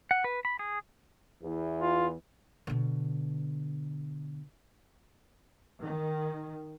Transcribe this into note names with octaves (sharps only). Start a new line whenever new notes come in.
F#5
B4
B5
G#4
E2 E3
F4
B2 D3
D#3